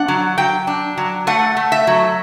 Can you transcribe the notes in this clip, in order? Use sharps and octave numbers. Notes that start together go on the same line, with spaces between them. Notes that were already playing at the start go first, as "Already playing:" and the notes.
Already playing: D4 F#5
F#3
F#3 G5
D4
F#3
A3 F#5
A3
E5
F#3